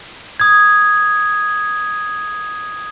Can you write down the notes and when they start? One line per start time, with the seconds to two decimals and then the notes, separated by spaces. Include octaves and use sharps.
0.40 D#6 G#6